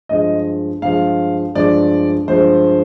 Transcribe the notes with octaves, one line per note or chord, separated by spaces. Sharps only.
G2 F3 G#3 D#5
G2 F3 G#3 F5
G2 F3 G#3 D5
G2 F3 G#3 C5